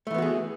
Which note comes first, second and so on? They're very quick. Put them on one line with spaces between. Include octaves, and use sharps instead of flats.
A3 E3 B3 F#4 G#4